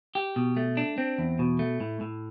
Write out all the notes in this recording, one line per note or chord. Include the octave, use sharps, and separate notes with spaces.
G4
B2
A3
D4
C4
E2
B2
A3
A2
A2